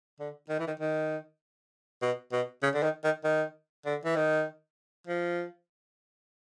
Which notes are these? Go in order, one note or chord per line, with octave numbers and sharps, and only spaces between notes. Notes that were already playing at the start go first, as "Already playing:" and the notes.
D3
D#3
E3
D#3
D#3
B2
B2
C#3
D3
D#3
D#3
D#3
D3
E3
D#3
F3